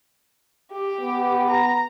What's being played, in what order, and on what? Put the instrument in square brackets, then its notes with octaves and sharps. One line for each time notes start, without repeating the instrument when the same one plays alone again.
[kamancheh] G4
[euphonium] B3
[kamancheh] A#5